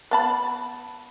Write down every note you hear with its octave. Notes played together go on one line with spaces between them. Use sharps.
B3 A5 B5